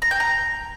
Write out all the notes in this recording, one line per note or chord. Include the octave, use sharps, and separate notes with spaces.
A#5
G5
A#5